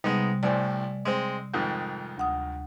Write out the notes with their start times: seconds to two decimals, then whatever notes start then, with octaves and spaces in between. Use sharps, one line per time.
0.04 C3 G3 G#3 B3 D#4
0.43 C2 A2 C4 D5 G#5
1.05 G#3 C4
1.54 F2 G#2 D#3
2.18 D2 F#5 D#6